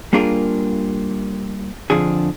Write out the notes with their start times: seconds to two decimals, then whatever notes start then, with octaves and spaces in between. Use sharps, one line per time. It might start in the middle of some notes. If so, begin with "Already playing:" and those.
0.13 G3 A#3 D4 F4 G#4 A#4
1.90 F2 D3 F3 D4 G#4